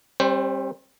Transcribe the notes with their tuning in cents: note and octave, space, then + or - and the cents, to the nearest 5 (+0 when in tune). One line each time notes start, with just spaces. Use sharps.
G3 +10 C4 +40 C5 -5